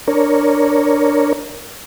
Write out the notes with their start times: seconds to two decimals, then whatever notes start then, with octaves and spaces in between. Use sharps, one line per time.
0.08 D4 A#4 C#5